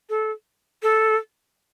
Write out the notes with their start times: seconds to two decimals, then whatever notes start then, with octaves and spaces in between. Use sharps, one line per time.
0.10 A4
0.83 A4